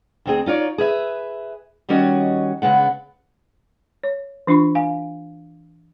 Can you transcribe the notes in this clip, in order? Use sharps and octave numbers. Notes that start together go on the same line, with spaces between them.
D2 C4 G#4
D#4 F4 C#5 D5
G#4 B4 E5
D#3 G3 C#4 F#4 C#5 D#5
C#3 G#3 B3 F#5
C#5
E3 D4 F4 B5 C#6
F5 G#5